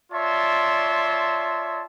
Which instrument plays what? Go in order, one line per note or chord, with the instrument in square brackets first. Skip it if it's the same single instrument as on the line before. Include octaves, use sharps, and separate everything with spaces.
[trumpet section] F4 C#5 D5 E5 A5 C6